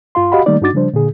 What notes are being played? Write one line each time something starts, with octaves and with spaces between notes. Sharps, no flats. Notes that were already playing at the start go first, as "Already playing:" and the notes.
G2 F4 F5 C6
F#4 G4 D#5 F5 F#5 B5
D#3 G3 A3 A#3 D#4 D5
G2 D4 D#4 F#4 D6 A6
C#3 F3 G3 D4 C5
A#2 D3 G#4